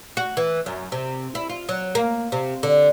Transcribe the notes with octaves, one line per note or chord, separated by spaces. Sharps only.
F#4
E3
F#2
C3
E4
F4
F#3
A#3
C3
D3